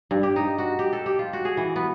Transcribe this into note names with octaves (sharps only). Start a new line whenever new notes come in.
G2
G4
D#4
F#4
G4
A4
G4
F4
F#4
G#4
E3
B3